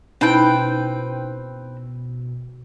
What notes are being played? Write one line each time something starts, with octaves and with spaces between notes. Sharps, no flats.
B2 C4 C#4 D#4 E4 B4 G5